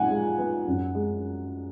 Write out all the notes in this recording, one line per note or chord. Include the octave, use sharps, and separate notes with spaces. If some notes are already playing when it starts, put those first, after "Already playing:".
Already playing: A#2 D#4 F#5 G#5
G#3
B3
F#2
G#3